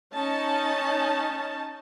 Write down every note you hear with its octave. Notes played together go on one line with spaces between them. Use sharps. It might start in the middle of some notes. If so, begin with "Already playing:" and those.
C#4 D#4 A5